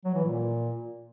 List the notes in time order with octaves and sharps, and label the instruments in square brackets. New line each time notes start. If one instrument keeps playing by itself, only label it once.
[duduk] F#3
E3
A#2